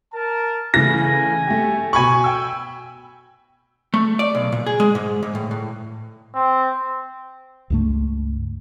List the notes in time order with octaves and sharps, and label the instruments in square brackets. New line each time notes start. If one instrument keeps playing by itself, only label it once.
[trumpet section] A#4 A5
[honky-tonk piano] C#3 E3 A3 [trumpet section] G#5 [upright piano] A#6
[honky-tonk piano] A3 G4
[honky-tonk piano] B2 G#6 F#7 [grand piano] G#5 B5 C#6
[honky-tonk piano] G5 E6
[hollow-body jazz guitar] A3
D5
B1
A#2
G#4
G#3
G#2
G#2
A2
A2
[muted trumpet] C4
[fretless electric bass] C#2 G2 A3